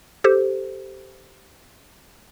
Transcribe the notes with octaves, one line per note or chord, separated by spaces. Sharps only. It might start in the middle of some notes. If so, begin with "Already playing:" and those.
G4 A4 C5